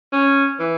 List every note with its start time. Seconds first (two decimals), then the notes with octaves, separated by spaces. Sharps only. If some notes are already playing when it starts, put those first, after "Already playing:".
0.13 C#4
0.60 E3